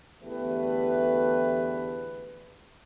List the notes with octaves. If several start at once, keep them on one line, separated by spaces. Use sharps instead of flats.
E2 D3 A3 G4 B4